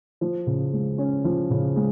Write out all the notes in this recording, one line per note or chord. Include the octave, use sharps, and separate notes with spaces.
F3
C#3
G#3
C#4
F3
C#3
G#3